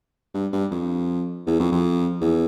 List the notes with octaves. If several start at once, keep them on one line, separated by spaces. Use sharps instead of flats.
G2
G2
F2
E2
F2
F2
E2